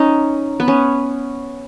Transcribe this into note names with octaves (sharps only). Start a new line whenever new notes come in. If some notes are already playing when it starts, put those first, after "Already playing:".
Already playing: C#4 D#4
B3
C#4